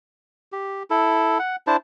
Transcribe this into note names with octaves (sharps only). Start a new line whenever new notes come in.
G4
E4 A4
F#5
D4 E4 C5 A5